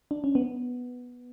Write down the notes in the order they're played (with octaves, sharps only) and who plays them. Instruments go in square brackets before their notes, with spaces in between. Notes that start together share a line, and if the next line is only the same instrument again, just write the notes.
[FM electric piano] D4
C#4
B3